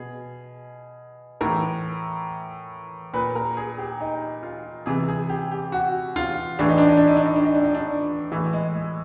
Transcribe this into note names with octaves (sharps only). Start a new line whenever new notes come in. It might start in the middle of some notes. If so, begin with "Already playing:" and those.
Already playing: B2 G#4
A2 E3 A#4
A#2 B4
A#4
G#4
G4
D#4
F4
C3 E3 G#4
G#4
G4
G4
F#4
F4
A2 E3 D4
D#4
D4
D#4
D4
D#4
D4
D#4
D4
D#4
D4
D#4
D4
A2 E3
G#3
G#3